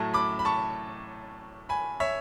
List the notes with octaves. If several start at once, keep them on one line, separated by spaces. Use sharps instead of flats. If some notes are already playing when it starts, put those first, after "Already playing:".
Already playing: A2 F#3 A3 A5
B5 D6
B5
A5 C#6
G#5 B5
C#5 E5